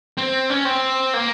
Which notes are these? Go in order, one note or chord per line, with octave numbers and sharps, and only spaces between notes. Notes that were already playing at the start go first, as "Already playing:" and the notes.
C4
C#4
C4
A#3